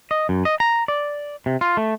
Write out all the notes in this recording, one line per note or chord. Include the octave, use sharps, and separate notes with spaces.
D#5
F#2
D#5
A#5
D5
C3
F4
A3